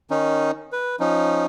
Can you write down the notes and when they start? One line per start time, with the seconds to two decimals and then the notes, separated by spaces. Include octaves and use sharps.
0.11 D#3 C#4 D#4
0.72 B4
1.00 F3 C#4 D#4